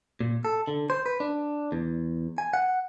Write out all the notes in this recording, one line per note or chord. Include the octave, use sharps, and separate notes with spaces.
A#2
A4
D3
C5
B4
D4
E2
G#5
F#5